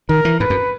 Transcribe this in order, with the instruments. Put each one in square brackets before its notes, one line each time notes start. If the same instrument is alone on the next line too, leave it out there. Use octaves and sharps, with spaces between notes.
[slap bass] D#3 [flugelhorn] A#4
[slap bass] E3
[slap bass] G#2 [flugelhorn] B4
[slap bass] F#2